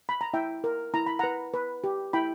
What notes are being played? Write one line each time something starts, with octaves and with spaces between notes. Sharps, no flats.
B5
A#5
E4 E5 G5
A#4
E4 A#5
B5
B4 F#5 A#5
B4
G4
E4 G5 B5